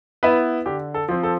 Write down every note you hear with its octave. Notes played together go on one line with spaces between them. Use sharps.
B3 E4 B4
D3 G4
A4
F3 C4
A4